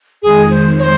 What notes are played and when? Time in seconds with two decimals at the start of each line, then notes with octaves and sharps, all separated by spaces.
0.22 F2 D#3 G#3 G#4
0.50 C5
0.78 C#5
0.82 C5